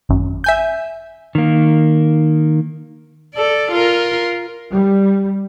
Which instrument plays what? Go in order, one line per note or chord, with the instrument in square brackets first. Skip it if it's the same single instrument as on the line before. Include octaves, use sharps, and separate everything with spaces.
[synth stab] G#1 F#2
E5 G#5 G6
[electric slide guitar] D#3 A#3
[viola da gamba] A4 D5
F4 A#4
[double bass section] G3